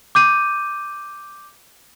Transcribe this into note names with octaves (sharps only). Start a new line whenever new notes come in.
D6 G6 D#7